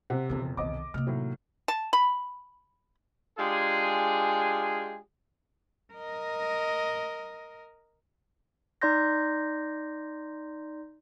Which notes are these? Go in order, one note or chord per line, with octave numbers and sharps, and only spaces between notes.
C3 F#5
E1 F2 C#3 F3
C2 D#3 D#5 D6
C3 A#3 F6
A2 D#3 F#3
A5
B5
G#3 D4 F4 G4 G#4
A#4 D#5
D#4 D5 C6 G6 A#6